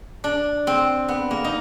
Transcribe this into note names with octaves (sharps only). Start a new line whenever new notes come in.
D4
C4
B3
A#3
D#4